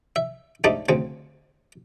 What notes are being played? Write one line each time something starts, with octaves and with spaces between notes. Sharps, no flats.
E5
G#2 G3 A3 D4 D#4
D2 C#3 C4